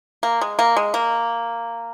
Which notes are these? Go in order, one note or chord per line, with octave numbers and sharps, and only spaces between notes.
A#3
G#3
A#3
G#3
A#3